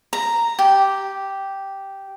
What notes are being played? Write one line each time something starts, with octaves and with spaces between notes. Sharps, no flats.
A#5
G4